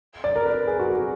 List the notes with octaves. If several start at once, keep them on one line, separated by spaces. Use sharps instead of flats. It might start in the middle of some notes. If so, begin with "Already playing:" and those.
D5
A#4
B4
G#4
F#4
G#4